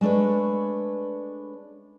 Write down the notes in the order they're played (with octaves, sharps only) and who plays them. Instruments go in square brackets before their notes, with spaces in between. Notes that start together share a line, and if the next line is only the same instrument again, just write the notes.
[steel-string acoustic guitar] G#3 A3 D4 B4 C#5